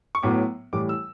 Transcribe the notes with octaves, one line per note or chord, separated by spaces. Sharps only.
C#6
A2 F#3 B3 D6
A2 E3 G3 D6
E6